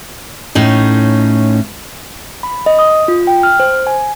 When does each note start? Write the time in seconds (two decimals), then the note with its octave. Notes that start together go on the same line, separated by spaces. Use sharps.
0.55 A2 C#4 D#4
2.43 B5
2.66 D#5
2.79 D#6
3.08 F4
3.27 G5
3.43 F6
3.60 C5
3.87 G#5